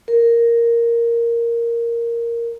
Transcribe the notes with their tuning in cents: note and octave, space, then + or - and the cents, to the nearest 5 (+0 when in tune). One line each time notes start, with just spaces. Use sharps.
A#4 +0